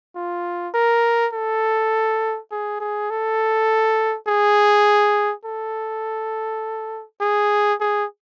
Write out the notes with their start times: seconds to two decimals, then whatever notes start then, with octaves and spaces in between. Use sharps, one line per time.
0.16 F4
0.74 A#4
1.33 A4
2.51 G#4
2.80 G#4
3.10 A4
4.28 G#4
5.45 A4
7.21 G#4
7.80 G#4